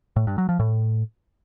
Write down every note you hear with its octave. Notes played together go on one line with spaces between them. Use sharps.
A2
G2
F#3
F3
A2